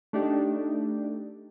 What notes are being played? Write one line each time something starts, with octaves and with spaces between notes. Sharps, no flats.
A3 D4 D#4 G4